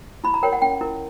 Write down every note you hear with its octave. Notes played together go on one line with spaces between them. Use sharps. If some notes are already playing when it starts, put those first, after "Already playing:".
E4 B5
A#5
A#4 C#5 G5
F#5
C#4 G5
E4 A#4